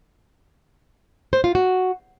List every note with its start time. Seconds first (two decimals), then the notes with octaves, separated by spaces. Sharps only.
1.33 C5
1.44 F4
1.55 F#4